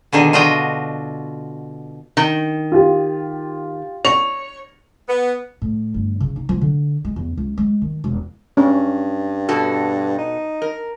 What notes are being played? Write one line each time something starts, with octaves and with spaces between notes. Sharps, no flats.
B2 D3 D#3 G#4
D3 F4 F#4 D#5 G5
D#3
F4 G4
C#5 F7
B3
A2
G1
C#3
D#4
F3
D3
G#3
E2
C#2
G#3
D#3
E1
G2 C#4
B2 F#4 A4
D#4
A#4